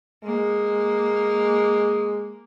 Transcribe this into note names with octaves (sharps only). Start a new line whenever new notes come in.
G#3 A#3